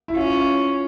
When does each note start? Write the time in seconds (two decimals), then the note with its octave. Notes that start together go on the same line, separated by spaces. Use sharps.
0.08 E4
0.16 C#4 F4